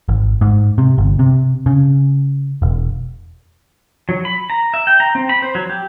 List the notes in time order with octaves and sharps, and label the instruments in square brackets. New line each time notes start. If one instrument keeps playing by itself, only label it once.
[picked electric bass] G#1
G#2
C3
G1
C3
C#3
E1
[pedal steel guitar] F#3
B5
A#5
E5
G5
A#5
C4
B5
C5
F#3
G4